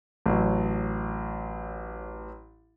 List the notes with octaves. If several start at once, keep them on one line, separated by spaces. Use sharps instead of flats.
A1 F#3